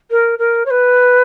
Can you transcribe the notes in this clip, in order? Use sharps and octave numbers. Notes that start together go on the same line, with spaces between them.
A#4
A#4
C#5
B4